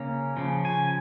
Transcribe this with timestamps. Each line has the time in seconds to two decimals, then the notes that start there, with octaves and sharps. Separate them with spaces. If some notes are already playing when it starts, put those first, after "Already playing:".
Already playing: C#3 A#3 C#4
0.37 C#3 F3
0.65 G#5